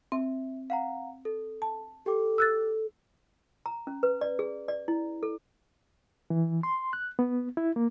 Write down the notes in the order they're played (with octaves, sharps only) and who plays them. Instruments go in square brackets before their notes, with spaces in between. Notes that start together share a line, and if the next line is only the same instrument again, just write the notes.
[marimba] C4 [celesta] E5
[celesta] F5 F#5 A#5
A4
[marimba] A5
[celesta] G4 G5 D6 [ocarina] A4
[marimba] E6 F#6 A6
[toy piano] A#5
C#4
B4
D5
G#4
D5
E4
A4
[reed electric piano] E3
C6
F#6
B3
E4
A#3